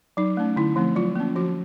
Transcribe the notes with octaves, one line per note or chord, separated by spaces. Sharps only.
F#3 D#4
A3 C#4
D3 E4
F3 A3 C4
F#3 F4
A#3 C#4
F3 F#4